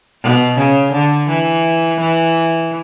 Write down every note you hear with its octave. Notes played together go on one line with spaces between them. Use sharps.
B2
C#3
D3
E3
E3